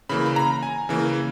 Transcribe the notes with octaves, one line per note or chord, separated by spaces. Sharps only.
C#3 E3 A#3 B5
B5
A#5
G#5
C#3 E3 A#3